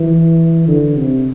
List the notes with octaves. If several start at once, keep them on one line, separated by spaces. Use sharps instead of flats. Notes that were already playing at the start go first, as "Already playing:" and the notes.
Already playing: E3
D3
C3